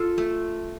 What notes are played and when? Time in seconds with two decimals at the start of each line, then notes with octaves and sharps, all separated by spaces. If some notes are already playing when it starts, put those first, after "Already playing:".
Already playing: F4 A4
0.18 A3